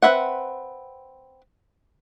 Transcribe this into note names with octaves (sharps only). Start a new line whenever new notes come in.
C4 D4 B4 E5 F#5